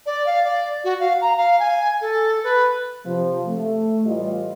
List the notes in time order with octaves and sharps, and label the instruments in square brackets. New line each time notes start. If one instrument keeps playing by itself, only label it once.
[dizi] D5
F5
D5
F#4
F5
A#5
F5
G#5
A4
B4
[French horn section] C3 F3
A3
A2 E3 G3 F4 G4 D#5